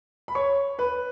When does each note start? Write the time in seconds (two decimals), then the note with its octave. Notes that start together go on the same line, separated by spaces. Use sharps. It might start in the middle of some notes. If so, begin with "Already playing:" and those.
0.28 B5
0.35 C#5 C#6
0.79 B4 B5